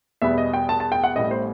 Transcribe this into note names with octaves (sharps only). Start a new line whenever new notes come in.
E2 B2 G3 B3 E5
D#5
G5
A5
A5
G5
F#5
A1 A2 G3 B3 D#5
C5